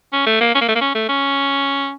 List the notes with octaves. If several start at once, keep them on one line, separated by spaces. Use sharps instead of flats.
C#4
A3
A#3
C#4
A#3
A3
A#3
C#4
A3
C#4